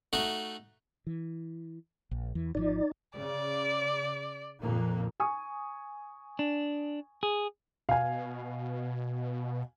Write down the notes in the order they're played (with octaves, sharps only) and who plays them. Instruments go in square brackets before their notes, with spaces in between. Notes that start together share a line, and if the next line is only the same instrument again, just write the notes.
[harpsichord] A3 D#4 F#4
[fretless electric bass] E3
A#1
E2 E3
[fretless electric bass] G#1 C3 F3 [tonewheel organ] D#4 D5
[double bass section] C#3 [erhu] D5
[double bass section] F2 A#2 A#3
[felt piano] G#5 C#6 D#6
[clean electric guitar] D4
G#4
[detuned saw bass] B2 [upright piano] F5 G#5